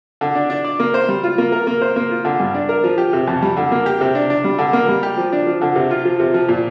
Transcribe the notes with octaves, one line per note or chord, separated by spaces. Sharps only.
D3
D4
D4
D5
A#3
C5
G3
F4
A#3
A#4
A#3
C5
A#3
F4
D3
G2
D4
A#4
F3
G4
C3
F2
G3
D3
A#3
G4
C3
D4
D4
G3
D3
A#3
G3
G4
F3
D4
F3
D3
C3
F4
F3
C3
F3
A#2